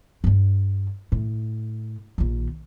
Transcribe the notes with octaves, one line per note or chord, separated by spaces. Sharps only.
G2 D4
A2
A#1 D#3